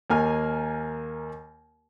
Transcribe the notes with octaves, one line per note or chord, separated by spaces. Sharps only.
D#2 A#3 G#5 F6